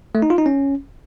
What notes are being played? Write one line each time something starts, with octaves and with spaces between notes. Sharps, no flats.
A3
D#4
F4
D#4
C#4